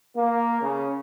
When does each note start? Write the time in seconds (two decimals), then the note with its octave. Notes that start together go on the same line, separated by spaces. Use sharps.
0.16 A#3
0.61 C#3